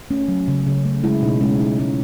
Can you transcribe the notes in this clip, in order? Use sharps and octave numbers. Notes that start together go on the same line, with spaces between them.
A3 C#4
F#3
C#3
C#3
A3
G#3 E4
B2 D#4
G#3 C#4
B2 D#4
G#3 C#4